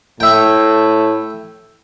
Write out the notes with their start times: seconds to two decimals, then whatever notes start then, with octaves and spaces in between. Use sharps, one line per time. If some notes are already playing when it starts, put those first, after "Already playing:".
0.20 A2 E5 G5